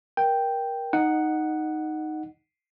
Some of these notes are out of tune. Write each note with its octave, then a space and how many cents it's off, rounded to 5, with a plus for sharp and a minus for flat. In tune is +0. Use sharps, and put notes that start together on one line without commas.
A#4 +20 G5 +0
D#4 +0 D#5 -20 F#5 +0